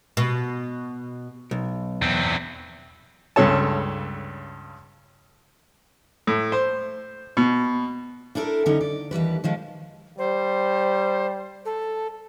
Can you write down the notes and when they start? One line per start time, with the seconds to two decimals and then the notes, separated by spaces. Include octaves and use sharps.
0.17 B2
1.51 B1
2.02 E2 C4
3.36 C#2 G2 C#3 A4 C#5 A5
6.27 A2
6.52 C5
7.37 B2
8.35 D4 E4 A4 A#4
8.66 D3 C#4 D#4 E4
8.81 D5
9.11 D#2 E3 G3 B4
9.44 D#3 F3 G#3
10.18 G3 C5
11.65 A4